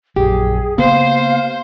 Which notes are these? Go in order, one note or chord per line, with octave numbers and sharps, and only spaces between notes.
A#1 F#2 G4 G#4
C#3 A#3 B3 C5 F5